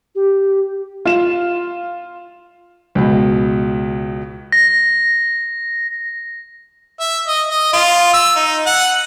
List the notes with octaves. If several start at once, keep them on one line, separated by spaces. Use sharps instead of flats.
G4
F4 E7
C#2 B2
A#6
E5
D#5
D#5
F4
E6
D#4
F#5